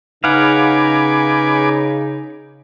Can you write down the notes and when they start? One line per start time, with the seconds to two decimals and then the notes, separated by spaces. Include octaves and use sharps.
0.24 C#3 D#4 B4 F5 F#5 G#5 D6